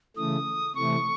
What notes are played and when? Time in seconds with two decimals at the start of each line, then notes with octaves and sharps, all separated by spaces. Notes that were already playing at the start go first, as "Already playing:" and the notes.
0.16 C#3 E3 A3 D#6
0.75 C3 E3 A3 C#6